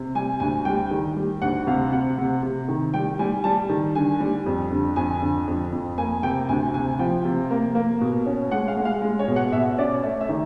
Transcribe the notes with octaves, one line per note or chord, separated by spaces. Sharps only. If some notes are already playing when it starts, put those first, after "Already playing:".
Already playing: C3
G3 G#5
D2 G#5
G3 G5
D#3
G3
D2 F#5
C3 F5
C3 F#5
C3
C3
D#3
G3 G5
G3 G#5
G3 A5
D#3
D3 G#5
G3
F2
D3
F2 G#5
D3
F2
F2
A#3 G#5
C3 G5
D2 G#5
C3 G#5
F3 G5
C3
A#3
A#3
B2
C#4
G#3 F#5
F5
G#3
F5
G#3
C#5
B2
F#5
B2 E5
C#4 D5
A3 E5
E5
D#3